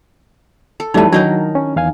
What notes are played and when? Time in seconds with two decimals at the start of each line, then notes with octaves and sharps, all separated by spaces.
0.80 A4
0.94 F2 E3 F#3 G3 A3 D#4 A5
1.13 D#3 F#3 D4 D#4 A#4 C#5
1.55 C#4
1.76 E2 F5 G#5